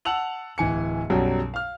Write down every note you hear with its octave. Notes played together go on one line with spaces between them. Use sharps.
F#5 A5 E6 F7 F#7
D1 E3 G#5 C#7
B1 F#2 F#3 G3
F5 F6